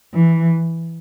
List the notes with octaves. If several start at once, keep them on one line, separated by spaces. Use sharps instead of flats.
E3